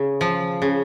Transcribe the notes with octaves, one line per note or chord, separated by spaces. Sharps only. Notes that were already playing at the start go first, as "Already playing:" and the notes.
Already playing: C#3
F3
C#3